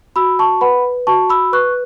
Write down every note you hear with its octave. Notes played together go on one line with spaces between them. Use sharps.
F#4 B5 E6
A5 C#6
B4 F#5 B5
F#4 A5 C#6
B5 E6
B4 C#6 F#6